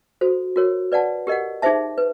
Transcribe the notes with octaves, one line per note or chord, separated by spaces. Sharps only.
F#4 A4 C5
F#4 A#4 C#5
B4 D5 F#5 A5
G4 A#4 D#5 F#5
D#4 G#4 C5 E5 A5
B4